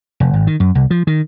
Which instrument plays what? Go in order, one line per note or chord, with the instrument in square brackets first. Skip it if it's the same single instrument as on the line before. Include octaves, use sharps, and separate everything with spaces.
[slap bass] F1
G#1
D#3
F#2
C2
F3
D#3